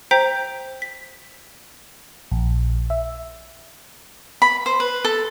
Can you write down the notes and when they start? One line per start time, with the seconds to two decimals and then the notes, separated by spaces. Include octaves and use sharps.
0.11 C5 G5 A#5 G6 B6
0.82 B6
2.31 A#1
2.90 E5
4.42 B5
4.66 C5
4.80 B4
5.05 A4